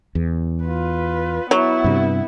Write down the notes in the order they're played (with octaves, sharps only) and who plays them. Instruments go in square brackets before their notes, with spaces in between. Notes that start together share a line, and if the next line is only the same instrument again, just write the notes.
[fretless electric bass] E2
[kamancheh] F4 B4
[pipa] F#3 [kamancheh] B3 E4
[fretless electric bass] G2 C3